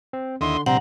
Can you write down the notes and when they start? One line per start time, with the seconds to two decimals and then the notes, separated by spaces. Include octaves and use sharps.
0.13 C4
0.41 D#2 D3 E4 D#5 C6
0.66 A#1 C3 G3 C4 F#5 A#5